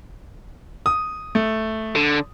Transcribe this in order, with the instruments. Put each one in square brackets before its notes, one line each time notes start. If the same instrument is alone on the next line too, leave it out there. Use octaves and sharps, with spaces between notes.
[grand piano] D#6
A3
[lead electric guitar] D3